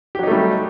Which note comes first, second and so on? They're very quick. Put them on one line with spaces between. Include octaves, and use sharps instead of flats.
G4 F#3 D#4 A3 G3